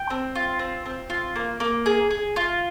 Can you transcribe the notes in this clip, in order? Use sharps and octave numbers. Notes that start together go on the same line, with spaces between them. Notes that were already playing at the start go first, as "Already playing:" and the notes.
Already playing: G5
C4
F4
C4
C4
F4
A#3
A#3
G#4
G#4
F4